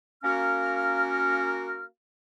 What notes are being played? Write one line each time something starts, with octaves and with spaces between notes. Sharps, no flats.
A#3 C#4 F#4 A#4 F5 F6